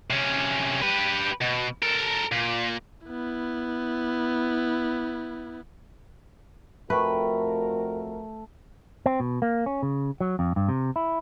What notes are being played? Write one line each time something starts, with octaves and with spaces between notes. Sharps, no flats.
C3 C#4
G4 B4
B2
A4 A#4
A#2
B3 E4
F2 A3 F#4 A#4 B4 G5
C4
B2
A#3
C#4
C#3
F#3
F2
G2
C3
E4